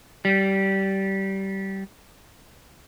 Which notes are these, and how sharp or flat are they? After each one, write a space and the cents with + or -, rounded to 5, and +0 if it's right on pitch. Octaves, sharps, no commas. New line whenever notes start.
G3 -20